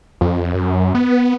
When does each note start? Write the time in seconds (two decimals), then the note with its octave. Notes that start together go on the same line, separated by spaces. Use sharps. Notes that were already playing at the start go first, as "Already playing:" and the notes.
0.21 F2
0.54 F#2
0.95 B3